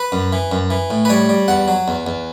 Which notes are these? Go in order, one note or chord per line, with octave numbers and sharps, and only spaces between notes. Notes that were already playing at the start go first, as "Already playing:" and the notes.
Already playing: B4
F#2
E3
F#2
E3
A2
B4
G3 C#5
G3
E2 F#5
F#3
E2
E2